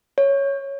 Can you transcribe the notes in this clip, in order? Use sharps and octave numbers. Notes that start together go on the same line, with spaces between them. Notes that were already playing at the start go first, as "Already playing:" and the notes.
C#5